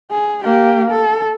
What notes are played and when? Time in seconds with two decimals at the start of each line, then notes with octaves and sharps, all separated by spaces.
0.11 G#4
0.44 A#3 G4
0.90 A4